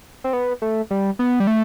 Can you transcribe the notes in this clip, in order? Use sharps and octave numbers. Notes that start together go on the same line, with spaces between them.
C4
B3
A3
G3
B3
G3
A3